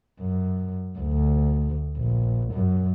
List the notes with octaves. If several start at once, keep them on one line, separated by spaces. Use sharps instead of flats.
F#2
D2
A#1
F#2